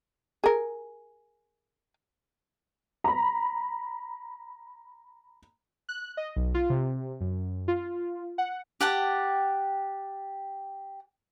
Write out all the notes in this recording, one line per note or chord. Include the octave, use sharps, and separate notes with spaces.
G#4 A#4
A#5 B5
F#6
D#5
B1
F4
C3
F#2
F4
F#5
G4 F#5 G5 A5